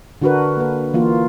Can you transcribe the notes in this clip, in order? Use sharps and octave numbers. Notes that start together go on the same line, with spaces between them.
D3 D4 F#4 A#4 B4
A#3 B4
E3 A#3 F4